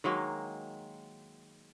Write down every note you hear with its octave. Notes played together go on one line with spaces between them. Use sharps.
D#3 F#3 G#3 A#3